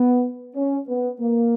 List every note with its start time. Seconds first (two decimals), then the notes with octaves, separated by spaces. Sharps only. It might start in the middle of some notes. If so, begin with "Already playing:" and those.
Already playing: B3
0.56 C#4
0.87 B3
1.20 A#3